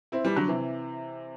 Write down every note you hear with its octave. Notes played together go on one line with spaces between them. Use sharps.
C4 E4
E3 G3
D3 F#3
C3 E3